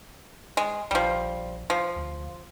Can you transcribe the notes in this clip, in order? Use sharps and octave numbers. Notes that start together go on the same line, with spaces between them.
G#3
A#1 F3 G3
F3
D2